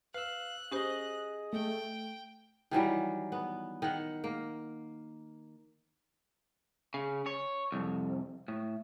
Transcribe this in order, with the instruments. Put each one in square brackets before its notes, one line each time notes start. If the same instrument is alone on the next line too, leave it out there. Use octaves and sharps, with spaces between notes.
[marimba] B4 [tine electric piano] F5 E6 [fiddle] F#6
[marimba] C#4 G4 C5 [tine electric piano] G#4 D#5
[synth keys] A3 [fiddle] G5
[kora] D#3 E3 F#3 G3
B3
D#3 F#5
A#3
[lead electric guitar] C#3
C#5
C2 F2
A2